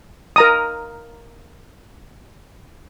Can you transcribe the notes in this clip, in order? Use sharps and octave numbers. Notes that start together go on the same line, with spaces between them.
A#4 A#5 D#6